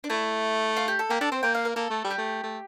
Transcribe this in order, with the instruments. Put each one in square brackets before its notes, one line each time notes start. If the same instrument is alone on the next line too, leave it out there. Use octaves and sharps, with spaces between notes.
[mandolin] D4
[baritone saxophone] A3 [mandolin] E4
[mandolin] F4
G4
A4
[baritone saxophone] A#3 [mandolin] G4
[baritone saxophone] D4 [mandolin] A4
[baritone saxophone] C4 [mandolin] C5
[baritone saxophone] A#3 [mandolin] G5
[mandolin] F5
A#4
[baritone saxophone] A#3 [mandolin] A4
[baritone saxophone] A3
G3
[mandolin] G4
[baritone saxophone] A3
A3